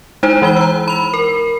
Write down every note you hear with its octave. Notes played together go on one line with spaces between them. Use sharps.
G#3 D#4 E4 C5
E3 G#3 B5 G7
A#5 E6
B5 F7
A#4